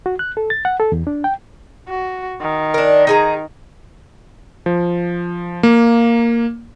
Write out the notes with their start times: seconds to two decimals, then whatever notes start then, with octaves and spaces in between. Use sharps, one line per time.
0.06 F#4
0.19 F#6
0.37 A4
0.50 A6
0.65 F#5
0.80 A4
0.92 E2
1.07 D4
1.24 G5
1.88 F#4
2.41 D#3
2.74 D4 A#4
3.07 D#4 G#4 A#5
4.66 F3
5.63 A#3